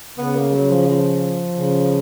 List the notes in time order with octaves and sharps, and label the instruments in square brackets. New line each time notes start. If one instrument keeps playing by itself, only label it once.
[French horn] C#3 [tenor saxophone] B3
[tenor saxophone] A#3
F#3
F3
F3
[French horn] C#3